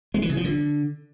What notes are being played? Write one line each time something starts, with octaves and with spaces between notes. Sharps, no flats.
G#3
E3
C#3
F3
D3